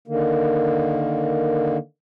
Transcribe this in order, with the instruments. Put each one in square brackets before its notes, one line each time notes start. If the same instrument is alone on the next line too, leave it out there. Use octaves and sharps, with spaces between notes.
[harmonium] D3 D#3 A#3